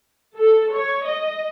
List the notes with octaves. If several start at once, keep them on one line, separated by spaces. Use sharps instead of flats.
A4
C#5
D#5